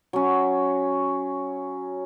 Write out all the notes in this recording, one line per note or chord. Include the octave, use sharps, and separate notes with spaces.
F#3 C#4